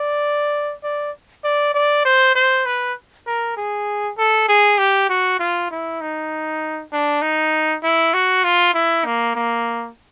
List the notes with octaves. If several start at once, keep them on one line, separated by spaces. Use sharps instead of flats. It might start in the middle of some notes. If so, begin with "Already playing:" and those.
Already playing: D5
D5
D5
D5
C5
C5
B4
A#4
G#4
A4
G#4
G4
F#4
F4
E4
D#4
D4
D#4
E4
F#4
F4
E4
A#3
A#3